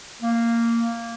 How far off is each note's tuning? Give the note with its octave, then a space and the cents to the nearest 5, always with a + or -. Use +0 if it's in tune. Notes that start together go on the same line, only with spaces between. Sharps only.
A#3 -10